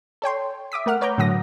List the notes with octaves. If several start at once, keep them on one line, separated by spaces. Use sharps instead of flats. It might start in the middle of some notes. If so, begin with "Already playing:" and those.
A4 C#5 G5 C6
E5 D6 D#6 B6
A3 A#4 F#5 F6
B4 C#5 A#5 D6 G6
A2 D3 F#3 F#5 D#6 A#6